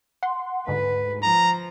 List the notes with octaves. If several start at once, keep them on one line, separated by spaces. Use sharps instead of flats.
F#5 C6
D2 G#2 D3 B4
F3 A#5